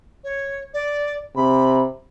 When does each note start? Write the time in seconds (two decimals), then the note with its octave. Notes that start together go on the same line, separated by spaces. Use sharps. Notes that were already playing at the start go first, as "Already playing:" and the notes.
0.24 C#5
0.74 D5
1.36 C3 B5